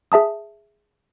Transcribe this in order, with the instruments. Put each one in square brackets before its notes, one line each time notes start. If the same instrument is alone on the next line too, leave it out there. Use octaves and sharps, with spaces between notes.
[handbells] G#4 E5 A5 D#6